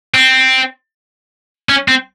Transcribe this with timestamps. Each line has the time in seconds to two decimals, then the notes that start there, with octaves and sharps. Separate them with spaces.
0.14 C4
1.69 C#4
1.88 C4